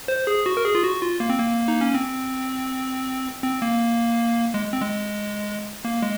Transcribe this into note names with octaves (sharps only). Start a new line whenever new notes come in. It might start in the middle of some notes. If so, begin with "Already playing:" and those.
C5
G#4
F#4
A#4
G#4
F4
F#4
F4
A#3
C4
A#3
D#4
C#4
C4
C4
A#3
G#3
C4
G#3
A#3
G#3